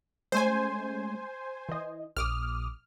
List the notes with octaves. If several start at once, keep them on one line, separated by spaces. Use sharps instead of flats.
G#3 A3 C#4 C5 G#5
E3 D#5
A#1 D6 D#6 F6